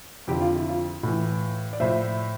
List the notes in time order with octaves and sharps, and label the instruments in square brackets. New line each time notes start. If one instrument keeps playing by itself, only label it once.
[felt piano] F2 D3 F3 G4
F4
E4
F4
A2 E3
D5
A2 F3 C5 E5